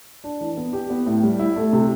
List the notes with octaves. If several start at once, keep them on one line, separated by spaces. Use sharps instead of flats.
D4
E3
B3
G4
B3
A2
G3
E4
A3
C3